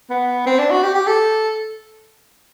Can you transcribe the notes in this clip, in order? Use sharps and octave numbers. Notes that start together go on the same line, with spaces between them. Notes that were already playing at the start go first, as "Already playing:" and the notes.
B3
C4
D4
F#4
G4
G4
A4